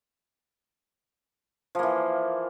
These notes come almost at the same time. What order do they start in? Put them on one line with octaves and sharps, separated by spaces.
F3 A#3 E3